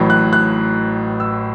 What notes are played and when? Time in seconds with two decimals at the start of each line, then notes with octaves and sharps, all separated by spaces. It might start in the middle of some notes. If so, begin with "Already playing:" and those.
Already playing: A1 A2 F#3
0.10 F#6
0.33 F#6
1.20 E6